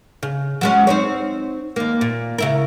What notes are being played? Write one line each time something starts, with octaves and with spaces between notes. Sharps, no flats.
C#3
F#3 G#3 C#4
C4 D#4 C#5
D#2 A#3
A#2
C#3 E4 A#4